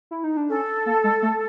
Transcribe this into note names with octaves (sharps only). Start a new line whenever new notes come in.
E4
D#4
D4
C#4 A4
A#3
G#3
A3